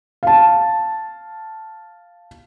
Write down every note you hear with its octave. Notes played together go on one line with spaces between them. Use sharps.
F5 A5